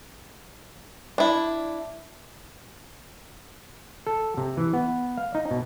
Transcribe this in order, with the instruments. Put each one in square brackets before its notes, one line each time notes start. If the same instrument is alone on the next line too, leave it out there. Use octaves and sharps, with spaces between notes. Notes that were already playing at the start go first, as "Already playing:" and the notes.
[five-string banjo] D4 E4
[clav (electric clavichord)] A4
C3
E3
B3
F5
D#4
B2